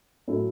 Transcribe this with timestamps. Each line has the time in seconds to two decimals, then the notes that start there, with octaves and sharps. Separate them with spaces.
0.28 A2 F#3 C#4 E4 A4